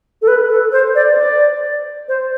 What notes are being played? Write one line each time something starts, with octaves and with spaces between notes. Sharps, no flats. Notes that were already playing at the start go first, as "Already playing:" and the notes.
A4
B4
A4
C5
D5
C5
D5
C5